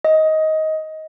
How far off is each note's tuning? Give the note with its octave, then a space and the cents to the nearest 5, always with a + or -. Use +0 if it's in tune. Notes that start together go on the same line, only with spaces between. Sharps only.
D#5 +15